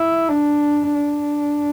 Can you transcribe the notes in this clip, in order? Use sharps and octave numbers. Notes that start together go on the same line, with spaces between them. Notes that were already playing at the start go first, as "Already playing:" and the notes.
Already playing: E4
D4
D4